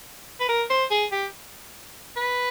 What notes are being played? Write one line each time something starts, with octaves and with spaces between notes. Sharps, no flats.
B4
A#4
C5
G#4
G4
B4